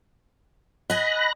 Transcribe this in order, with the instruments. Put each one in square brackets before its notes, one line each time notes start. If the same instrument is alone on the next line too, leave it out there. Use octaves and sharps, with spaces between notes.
[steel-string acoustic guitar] D#5 G#5 [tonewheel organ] B5 F#6 A#6